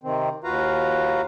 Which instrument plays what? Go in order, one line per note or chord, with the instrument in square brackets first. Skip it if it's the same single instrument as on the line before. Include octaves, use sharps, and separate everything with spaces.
[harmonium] C3 D#3 C4
D#2 F4 F#4 B4 F5 A#5